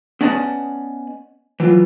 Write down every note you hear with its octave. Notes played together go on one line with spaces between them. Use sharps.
B3 C#4 D5 D#5 A5
E3 F#3 F4